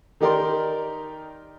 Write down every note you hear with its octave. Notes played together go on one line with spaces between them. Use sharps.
D#3 D#4 G4 A#4 D5 C6